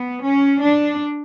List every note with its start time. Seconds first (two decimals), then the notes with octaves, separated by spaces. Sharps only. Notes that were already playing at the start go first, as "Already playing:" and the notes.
Already playing: B3
0.23 C#4
0.62 D4